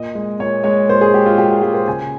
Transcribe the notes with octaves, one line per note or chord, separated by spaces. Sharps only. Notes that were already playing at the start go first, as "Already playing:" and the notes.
Already playing: A#2 D#5
G#3
A#2 C#5
G#3 C#5
A#2 C5
G#4
G#3 G4
F4
A#2 G4
G4
G#3 G4
C5
C#3 G#5